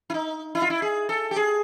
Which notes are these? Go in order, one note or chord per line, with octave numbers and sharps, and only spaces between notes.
E4
D#4
E4
F4
E4
G#4
A4
G4
G#4